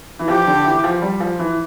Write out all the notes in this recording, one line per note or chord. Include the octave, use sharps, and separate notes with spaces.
E3
F3 G4
D3
E3
F3
G3
F3
E3